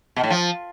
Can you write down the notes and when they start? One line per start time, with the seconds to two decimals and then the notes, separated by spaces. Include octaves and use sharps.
0.16 B2
0.23 A2
0.30 F3